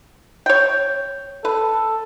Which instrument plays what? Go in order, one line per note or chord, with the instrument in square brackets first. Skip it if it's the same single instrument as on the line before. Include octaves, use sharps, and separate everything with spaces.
[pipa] C#5 G5
[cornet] A4 [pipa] B4